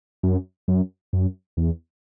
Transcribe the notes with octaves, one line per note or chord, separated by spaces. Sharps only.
F#2
F#2
F#2
E2